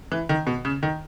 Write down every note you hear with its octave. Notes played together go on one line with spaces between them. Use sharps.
E3
D#3
B2
C#3
D#3